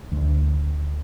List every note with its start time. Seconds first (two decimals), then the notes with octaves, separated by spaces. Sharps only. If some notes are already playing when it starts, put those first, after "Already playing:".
0.12 D2